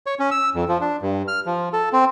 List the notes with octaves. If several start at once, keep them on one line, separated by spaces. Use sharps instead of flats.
C#5
C#4
E6
F2
F3
D4
G2
F6
F3
A4
C4